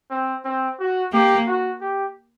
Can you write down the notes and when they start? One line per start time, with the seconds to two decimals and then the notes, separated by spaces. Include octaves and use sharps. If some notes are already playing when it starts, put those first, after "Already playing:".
0.10 C4
0.45 C4
0.79 F#4
1.12 A#3 G4
1.47 F#4
1.81 G4